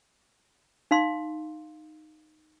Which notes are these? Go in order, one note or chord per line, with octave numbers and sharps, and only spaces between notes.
D#4 F5 C6